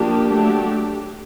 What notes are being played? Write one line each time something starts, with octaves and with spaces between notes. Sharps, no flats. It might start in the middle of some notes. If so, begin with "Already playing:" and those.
Already playing: F3 A#3 D4 G4
F#3 A3 D4